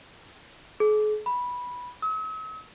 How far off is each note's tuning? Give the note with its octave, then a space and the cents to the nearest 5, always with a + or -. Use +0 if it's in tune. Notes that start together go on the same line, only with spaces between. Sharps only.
G#4 +45
B5 -10
E6 -45